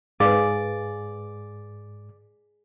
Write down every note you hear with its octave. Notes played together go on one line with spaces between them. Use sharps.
G#2 G#4 B4 D5 F5